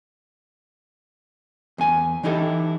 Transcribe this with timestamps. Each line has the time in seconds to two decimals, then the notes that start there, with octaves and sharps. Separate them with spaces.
1.78 E2 G#5
2.23 E3 D#4 E4 G4 A4